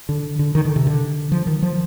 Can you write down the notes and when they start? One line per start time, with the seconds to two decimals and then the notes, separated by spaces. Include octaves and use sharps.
0.09 D3
0.39 D3
0.55 D#3
0.65 D3
0.76 C3
0.87 D3
1.32 F3
1.47 D#3
1.62 F3